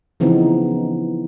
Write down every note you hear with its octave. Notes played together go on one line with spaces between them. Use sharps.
C#3 E3 F3 B3 C4 D#4